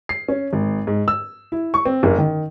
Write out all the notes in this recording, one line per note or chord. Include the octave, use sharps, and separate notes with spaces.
C7
C#4
G#1
G#2
E6
E4
C#6
C4
F#1
D#3